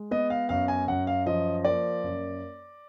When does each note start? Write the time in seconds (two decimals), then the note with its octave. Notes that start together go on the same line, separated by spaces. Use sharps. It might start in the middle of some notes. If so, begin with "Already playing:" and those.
Already playing: G#3
0.11 B3 D#5
0.30 F5
0.49 F#2 F5
0.68 G#5
0.88 F#2 F#5
1.07 F5
1.26 F3 D#5
1.65 A#3 D5
2.04 F#2